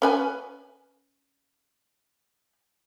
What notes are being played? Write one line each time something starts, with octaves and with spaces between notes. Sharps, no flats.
C#4 B4 G#5